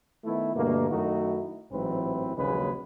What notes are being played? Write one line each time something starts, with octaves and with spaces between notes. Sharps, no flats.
D#3 A3 B3 E4
G2 B2 D3 A3 A#3
F#2 D#3 A3 D#4 E4 F#4
A1 G#2 E3 F#3 C4 B4
A#1 D#2 C#3 F#3 G#3 B4